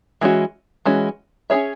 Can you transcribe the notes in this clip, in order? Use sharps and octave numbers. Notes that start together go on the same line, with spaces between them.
E3 G#3 C#4 F#4
E3 G#3 C#4 F#4
C#4 E4 G#4 C#5 E5